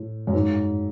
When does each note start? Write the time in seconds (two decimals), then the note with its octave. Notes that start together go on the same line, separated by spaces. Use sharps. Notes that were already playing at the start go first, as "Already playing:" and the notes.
Already playing: A2
0.27 F#2
0.34 G#2